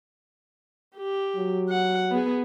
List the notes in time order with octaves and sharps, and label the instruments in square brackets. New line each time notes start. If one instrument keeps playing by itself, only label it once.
[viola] G4
[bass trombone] F#3
[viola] F#5
B3 G#4